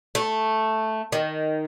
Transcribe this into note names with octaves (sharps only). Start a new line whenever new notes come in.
A3
D#3